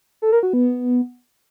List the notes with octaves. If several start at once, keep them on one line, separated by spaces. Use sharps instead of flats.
A4
A#4
F#4
B3